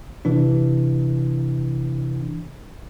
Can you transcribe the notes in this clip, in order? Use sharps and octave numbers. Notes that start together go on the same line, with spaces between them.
C3 E3 D4